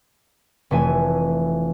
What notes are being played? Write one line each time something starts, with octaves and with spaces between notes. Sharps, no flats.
F1 E3 A3 E5 G#5 D#7